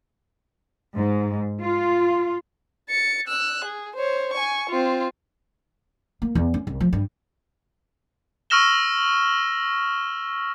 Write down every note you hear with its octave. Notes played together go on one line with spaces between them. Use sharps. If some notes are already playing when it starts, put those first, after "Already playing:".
G#2
F4
A6 C#7
E6 F#6
G#4
C5 C#5
G#5 C#6
C4 F4
A#3
E2
C#4
C2
F3
G2
C#6 E6 F6 A#6 E7 G7